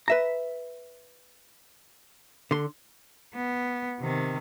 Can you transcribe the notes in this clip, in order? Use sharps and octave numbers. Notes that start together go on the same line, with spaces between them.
B4 E5 A#5
D3 C6
B3
C3 D#3